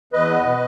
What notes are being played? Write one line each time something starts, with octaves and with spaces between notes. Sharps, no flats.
E2 B4 D#5
B3
B2